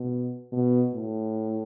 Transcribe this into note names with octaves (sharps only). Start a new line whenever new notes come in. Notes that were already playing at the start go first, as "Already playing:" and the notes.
Already playing: B2
B2
A2